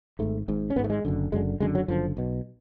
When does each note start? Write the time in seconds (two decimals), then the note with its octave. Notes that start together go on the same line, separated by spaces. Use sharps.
0.19 G#1 G#2 A3
0.48 G#1 G#2
0.70 C#4
0.76 G#1 B3
0.79 G#2
0.84 A3
0.90 G#3
1.05 F#1 F#2 D3
1.32 F#1 F#2 D3 G#3
1.60 F#1 F#2 D3 G#3
1.75 F#3
1.88 F#1 F#2 D3 F3
2.17 B1 B2